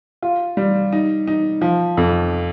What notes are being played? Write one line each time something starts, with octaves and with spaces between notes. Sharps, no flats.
F4
G3
D#4
D#4
F3
F2